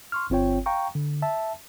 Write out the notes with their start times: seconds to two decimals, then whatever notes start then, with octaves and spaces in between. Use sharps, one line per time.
0.12 C6 C#6 F6
0.30 G1 C4 F4 C#5 G5
0.66 F5 G5 A#5 C#6
0.95 D3
1.22 E5 A5